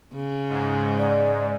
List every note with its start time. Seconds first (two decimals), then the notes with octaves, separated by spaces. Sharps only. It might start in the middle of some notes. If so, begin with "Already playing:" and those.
0.14 C#3
0.49 G#2
0.98 D5